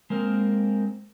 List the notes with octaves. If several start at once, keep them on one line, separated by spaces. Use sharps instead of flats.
G#3 A#3 C4 A#4